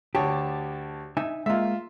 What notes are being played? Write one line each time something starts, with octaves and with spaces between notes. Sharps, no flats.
D2 G4 C#5 A5
D#4 E5 G#5
G#3 A#3 F4 E5